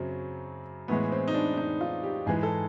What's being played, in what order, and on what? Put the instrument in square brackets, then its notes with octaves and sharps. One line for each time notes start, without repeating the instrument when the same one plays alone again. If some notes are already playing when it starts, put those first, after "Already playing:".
Already playing: [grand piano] F#2 C#3 F#3 C4
A2 E3 G#3 B3
C4
D#4
D4
D#4
F4
G4
G#2 E3 G#3 G#4
A4